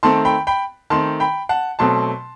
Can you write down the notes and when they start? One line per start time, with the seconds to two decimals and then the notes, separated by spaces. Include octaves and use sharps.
0.03 D#3 A3 C4 A5 C6
0.25 G5 B5
0.47 G5 B5
0.90 D#3 A3 C4 A5 C6
1.20 G5 B5
1.49 F#5 A5
1.79 B2 F#3 A3 C4 A5 C6